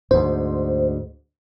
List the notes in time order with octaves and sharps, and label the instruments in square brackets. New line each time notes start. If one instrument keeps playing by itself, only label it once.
[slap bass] D2 G#2 [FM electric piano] C5